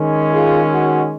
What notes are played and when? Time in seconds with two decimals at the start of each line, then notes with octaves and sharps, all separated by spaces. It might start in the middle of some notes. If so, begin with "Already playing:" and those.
Already playing: D#3 G#3 C#4
0.32 F4 G#4
0.73 F#4